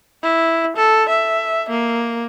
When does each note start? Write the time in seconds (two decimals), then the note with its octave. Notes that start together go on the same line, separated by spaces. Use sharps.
0.23 E4
0.77 A4
1.09 E5
1.70 A#3